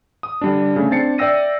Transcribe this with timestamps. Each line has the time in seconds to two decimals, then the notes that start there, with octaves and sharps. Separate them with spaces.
0.23 D#6
0.41 D3 G3 D4
0.76 C#3 A3
0.91 C4 D4 A6 C7 C#7
1.18 D5 E5 G5 E6 A#6 D#7